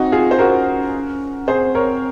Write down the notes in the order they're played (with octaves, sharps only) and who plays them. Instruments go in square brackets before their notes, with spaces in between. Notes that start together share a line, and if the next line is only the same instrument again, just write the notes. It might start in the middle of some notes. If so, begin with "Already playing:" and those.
Already playing: [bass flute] C4 [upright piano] D#4 F#4
[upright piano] F4 G#4
C5
[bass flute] C#4 [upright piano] F#4 A#4
[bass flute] C4 [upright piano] G#4 C5
[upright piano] A#4 C#5